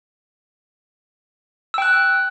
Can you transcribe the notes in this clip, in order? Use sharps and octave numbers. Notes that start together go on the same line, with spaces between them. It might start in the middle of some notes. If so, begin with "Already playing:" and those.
G5 E6 F#6